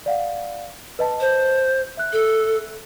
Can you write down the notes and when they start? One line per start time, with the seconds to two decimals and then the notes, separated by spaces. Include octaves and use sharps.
0.06 D5 F5 F#5
0.99 B4 D#5 A5
1.20 C5
1.97 E5 F#6
2.13 A4